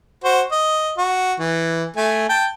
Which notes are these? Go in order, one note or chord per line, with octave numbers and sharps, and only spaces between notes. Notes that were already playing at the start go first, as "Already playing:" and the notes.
F#4 C5
D#5
F#4
E3
A3 G#5
G5 A5